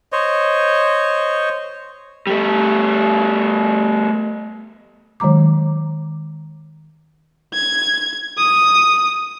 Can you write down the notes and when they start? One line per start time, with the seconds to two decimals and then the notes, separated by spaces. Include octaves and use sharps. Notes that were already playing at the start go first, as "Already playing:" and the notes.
0.12 C5 C#5 D#5
2.27 G3 A3
5.20 D#3 F#3 G#3 A#5 D6
7.54 G#6
8.38 D#6